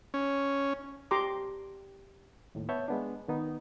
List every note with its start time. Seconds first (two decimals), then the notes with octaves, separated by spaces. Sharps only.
0.14 C#4
1.11 G4 A#5 C6 D6
2.55 D#2 A2
2.69 B3 C#5 E5 A5 G6
2.88 G#3 B3 D4
3.28 D#3 B3 D#4